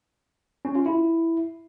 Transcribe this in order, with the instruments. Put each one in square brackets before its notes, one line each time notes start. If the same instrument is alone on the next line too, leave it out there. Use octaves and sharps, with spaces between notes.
[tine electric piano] C#4
F4
E4